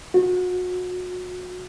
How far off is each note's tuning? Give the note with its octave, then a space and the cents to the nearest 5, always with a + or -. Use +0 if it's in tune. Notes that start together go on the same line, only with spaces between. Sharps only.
F#4 -30